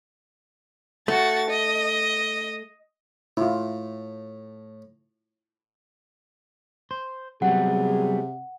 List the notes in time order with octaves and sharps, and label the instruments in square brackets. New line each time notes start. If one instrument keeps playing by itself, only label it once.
[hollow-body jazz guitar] A3 [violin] F#4 A6
[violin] D#5
[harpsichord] A2 [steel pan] E4 F4
[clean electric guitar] C5
[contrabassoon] C3 [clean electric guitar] F#3 G3 B3 [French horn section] G#4 [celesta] F#5